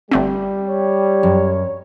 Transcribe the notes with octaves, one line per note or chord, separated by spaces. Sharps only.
G1 G3 A3 C4
C#5
F#2